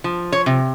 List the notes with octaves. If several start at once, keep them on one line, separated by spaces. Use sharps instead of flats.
F3
C#5
C3